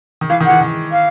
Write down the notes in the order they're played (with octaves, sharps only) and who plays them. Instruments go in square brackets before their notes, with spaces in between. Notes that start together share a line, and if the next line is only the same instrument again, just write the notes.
[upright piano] D#3
[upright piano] E3 [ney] F5
[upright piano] D#3
[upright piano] E3 [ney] F#5
[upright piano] D#3
[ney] F5